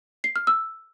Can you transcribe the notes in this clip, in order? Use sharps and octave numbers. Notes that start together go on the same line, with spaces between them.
C7
F6
E6